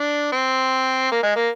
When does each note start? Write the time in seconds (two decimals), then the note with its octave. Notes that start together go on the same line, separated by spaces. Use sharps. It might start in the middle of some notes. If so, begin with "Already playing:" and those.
Already playing: D4
0.32 C4
1.12 A#3
1.23 G#3
1.36 A#3